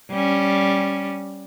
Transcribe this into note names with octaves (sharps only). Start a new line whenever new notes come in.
G3 C#4